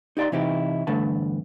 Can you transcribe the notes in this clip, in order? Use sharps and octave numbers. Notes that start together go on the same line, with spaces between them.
D#4 G4 D5 A#5 C6
C3 E3 D#4 E4 G4
E2 G2 D3 A3 B4 A5